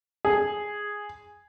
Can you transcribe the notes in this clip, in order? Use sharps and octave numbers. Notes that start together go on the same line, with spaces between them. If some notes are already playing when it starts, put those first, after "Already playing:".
G#4